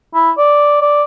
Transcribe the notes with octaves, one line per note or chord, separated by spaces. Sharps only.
E4
D5
D5